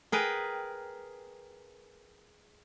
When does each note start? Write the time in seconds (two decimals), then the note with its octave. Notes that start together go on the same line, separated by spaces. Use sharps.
0.12 G#4 A#4 B4 G5